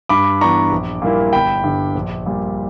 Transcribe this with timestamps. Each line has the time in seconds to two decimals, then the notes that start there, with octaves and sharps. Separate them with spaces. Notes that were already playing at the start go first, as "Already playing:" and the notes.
0.09 G2 B5 D6
0.41 E3 B3 D4 A#5 C#6
0.72 A#1
1.02 A#2 G3 A#3 E4
1.33 G1 G5 B5
1.64 G2 D3
1.95 A#1
2.26 A#2 G3